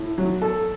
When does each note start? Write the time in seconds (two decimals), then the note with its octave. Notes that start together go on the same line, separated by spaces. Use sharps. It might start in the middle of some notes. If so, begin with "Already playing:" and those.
Already playing: A2
0.18 F#3
0.42 A4